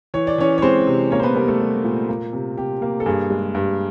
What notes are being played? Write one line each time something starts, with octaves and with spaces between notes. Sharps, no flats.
E3 C#5
D5
E3 C#4 C#5
C#5
G#3 C4 C5
C3
A#3 C#4 C#5
C5
B3 B4
G3 A#3 A#4
A3 A4
G3
A#2
A#3
C3
C3 G4
A#3
A4
G2 G#4
G#3
G2